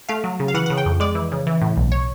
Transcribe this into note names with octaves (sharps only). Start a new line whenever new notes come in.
A3 F5
F#3
C#3
F5
E3 F#5
C#3 F#5
G5
F2
G#3 D5
E3
C#3
E3
A2
B1
C#5